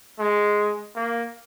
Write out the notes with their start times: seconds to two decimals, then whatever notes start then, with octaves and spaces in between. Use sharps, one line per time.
0.19 G#3
0.95 A#3